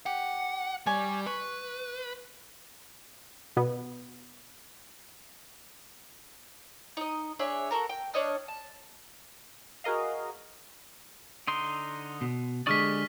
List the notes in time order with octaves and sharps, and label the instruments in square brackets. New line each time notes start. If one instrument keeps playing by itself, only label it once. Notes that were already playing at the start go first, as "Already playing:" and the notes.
[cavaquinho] G4 [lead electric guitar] F#5
[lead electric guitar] G3 [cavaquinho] C#5 G#5
[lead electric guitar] B4 [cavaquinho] C#6
[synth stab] B2 B3
[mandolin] D#4 D#5
D4 G#4 C#5 E5
F#4 A4 A#4 A#5
G5
D4 C#5 D#5 F6
A5
[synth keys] F#4 G#4 A#4 D#5 F5
[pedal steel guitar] D3 D#4 C6
[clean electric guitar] B2
[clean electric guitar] D3 G#3 [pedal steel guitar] G4 G#4 D5 [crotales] C#6 F6 B6